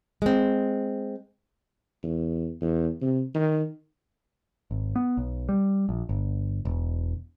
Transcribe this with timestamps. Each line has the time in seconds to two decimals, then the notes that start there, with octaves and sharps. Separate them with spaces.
0.22 G#3 C4
2.03 E2
2.61 E2
3.01 C3
3.34 D#3
4.71 G#1
4.96 B3
5.17 B1
5.49 G3
5.89 A#1
6.09 G1
6.65 E1